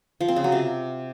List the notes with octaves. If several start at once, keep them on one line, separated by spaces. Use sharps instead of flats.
F3
C4
C#3
F#3
C3